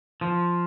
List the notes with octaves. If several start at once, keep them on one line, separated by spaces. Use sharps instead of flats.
F3